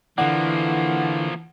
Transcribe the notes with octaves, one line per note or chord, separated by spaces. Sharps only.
D3 E3 F3 A#3 D5 F#5